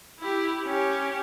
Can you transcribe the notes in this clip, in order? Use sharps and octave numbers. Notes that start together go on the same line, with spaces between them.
E4 G4
C#4 G4